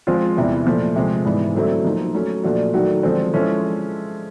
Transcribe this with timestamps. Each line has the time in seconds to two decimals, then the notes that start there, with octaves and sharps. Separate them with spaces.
0.07 F3 G#3 C4 F4
0.36 E2 C3 E3 G3
0.66 A#2 F3 A3
0.96 C3 F3 G#3
1.25 G#2 E3 G3 B3
1.55 D3 F#3 A3 C4 E4
1.85 F3 A#3 D#4
2.14 F#3 A3 C#4
2.44 A#2 F3 A3 D4 F#4
2.74 D#3 F#3 A3 D4 F#4
3.03 D3 F3 G#3 C4
3.33 F3 G#3 C#4 E4 A4